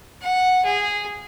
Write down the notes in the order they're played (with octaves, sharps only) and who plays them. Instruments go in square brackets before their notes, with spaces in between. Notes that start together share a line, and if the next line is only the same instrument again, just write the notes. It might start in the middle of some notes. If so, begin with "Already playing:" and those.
[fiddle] F#5
G#4